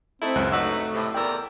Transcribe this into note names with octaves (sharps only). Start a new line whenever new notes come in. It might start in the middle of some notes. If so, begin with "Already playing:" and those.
A3 C4 D#4 E4
C#2 F#2 F#6
F#3 A3 D#4 B4 F#5 C#6 E6
A2 C3
E2 A#4 D5 G5 E6